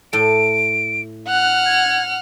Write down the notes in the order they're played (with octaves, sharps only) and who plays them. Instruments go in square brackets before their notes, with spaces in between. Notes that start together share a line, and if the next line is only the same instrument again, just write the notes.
[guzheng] A2 A4 [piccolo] D7
[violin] F#5 F6 [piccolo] F#6
[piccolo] G#6